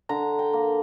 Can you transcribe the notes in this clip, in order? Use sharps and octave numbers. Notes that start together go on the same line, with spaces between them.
D3 A#5
G5
A#3